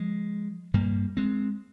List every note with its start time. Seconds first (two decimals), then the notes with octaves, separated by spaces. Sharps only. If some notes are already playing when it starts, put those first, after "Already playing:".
Already playing: F3 G#3
0.74 G2 G3 A#3
1.17 G#3 C4